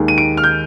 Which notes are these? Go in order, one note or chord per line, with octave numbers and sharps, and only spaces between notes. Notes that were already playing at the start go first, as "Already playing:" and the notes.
Already playing: D#2 D#3 G#3
D#7
D7
F6
G6